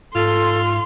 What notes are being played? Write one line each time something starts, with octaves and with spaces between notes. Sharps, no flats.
G#2 F4 A4 C6